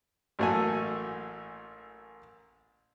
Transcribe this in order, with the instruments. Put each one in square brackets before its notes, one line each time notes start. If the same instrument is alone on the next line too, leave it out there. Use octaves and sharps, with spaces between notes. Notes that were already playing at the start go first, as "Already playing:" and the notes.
[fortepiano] A1 F#3 A3 A#3 G#5